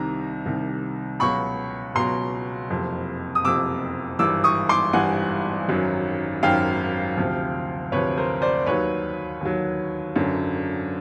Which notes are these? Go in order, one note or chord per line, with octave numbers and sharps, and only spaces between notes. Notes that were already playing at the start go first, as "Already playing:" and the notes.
Already playing: C2 C3 D#3 A#5
C2 C3 D#3
C#2 B2 F#3 B5 C#6
C#2 B2 F#3 A#5 C6
F#1 F2 C3
D#6
F#1 F2 C3 D6 E6
G#1 G2 E3 D6 E6
C#6 D#6
C6 D6
G#1 G2 E3 F#5 G#5
G#1 F#2 D#3 F#3
G#1 F#2 D#3 F#3 F5 G5
D2 C3 F3
D2 C3 F3 B4 C#5
A#4 C5
C5 D5
D#2 D#3 F#3 B4 C#5
D#2 D#3 F#3
G#1 F#2 D3 F#3